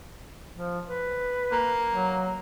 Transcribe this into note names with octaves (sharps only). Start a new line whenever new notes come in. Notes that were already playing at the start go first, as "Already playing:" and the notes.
F3
B4
A#3
F#3